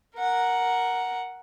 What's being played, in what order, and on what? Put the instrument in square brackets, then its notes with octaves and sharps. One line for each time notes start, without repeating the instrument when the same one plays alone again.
[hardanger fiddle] A#4 F#5